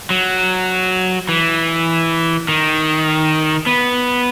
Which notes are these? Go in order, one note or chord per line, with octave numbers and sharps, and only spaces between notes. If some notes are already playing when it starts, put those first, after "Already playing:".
F#3
E3
D#3
B3